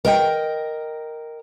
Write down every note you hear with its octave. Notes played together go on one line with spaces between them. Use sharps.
A#4 D#5 G5